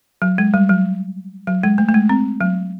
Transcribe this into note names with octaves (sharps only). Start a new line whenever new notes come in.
F#3
G#3
G3
F#3
F#3
G#3
A3
A3
G#3
C4
F#3